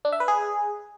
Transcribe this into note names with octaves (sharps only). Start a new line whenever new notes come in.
D4
E5
B4
G#4